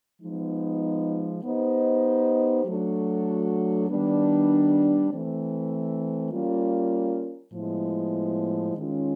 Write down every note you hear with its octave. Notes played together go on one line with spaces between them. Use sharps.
F3 G#3 B3 D#4
B3 D#4 G4 C5 D#5
F#3 A3 D4 F#4 A4
D#3 G3 B3 D4
E3 A3 C4
G3 A#3 C#4 F4
A2 F3 G#3 B3 E4
D#3 G#3 C#4 F4